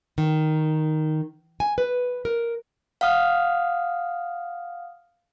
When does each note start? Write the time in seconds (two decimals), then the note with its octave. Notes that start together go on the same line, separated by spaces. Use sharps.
0.18 D#3
1.60 G#5
1.78 B4
2.25 A#4
3.01 F5 F#5 D#6 F6